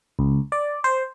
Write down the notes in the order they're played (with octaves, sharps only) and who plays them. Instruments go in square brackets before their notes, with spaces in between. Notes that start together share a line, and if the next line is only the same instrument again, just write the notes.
[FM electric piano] C#2
D5
C5